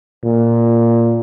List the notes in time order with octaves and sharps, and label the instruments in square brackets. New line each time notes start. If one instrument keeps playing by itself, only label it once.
[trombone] A#2